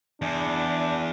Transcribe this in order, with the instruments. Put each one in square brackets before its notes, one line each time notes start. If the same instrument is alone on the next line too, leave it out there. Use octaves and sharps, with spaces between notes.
[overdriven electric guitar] E2 [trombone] D4